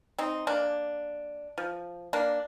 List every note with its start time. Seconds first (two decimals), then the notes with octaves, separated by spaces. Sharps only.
0.18 C4 D#4
0.47 A#3 D4
1.58 F3
2.13 A#3 D4